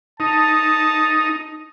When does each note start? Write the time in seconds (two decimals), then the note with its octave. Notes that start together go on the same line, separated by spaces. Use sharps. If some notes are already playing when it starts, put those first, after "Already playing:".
0.20 D#4 A5